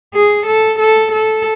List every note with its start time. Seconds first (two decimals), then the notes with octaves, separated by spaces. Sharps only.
0.14 G#4
0.46 A4
0.79 A4
1.12 A4